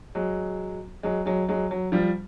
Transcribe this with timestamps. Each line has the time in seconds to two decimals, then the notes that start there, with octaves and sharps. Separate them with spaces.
0.15 F#3 G#3
1.03 F#3 G#3
1.26 F#3 G#3
1.48 F#3 G#3
1.71 F#3
1.92 F3 G3